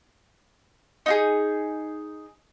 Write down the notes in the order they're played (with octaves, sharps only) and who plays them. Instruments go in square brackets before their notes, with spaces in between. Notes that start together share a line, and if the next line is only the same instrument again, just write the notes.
[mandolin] D#4 F#4 G#4